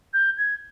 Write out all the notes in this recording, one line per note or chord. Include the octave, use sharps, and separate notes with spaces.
G6
G#6